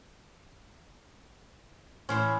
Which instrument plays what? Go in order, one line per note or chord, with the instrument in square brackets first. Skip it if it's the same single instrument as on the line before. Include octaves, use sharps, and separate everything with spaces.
[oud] A2 E3 C5 [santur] C#4